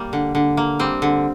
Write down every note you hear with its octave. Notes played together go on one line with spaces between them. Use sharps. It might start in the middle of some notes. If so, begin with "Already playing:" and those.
Already playing: G3 A#3
D3
D3
A#3
G3 C4
D3